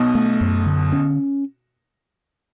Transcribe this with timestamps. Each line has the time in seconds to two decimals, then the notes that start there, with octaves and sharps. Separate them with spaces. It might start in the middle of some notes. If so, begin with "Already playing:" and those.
Already playing: B1 B2
0.15 A3
0.41 F#2
0.66 D3
0.92 C#4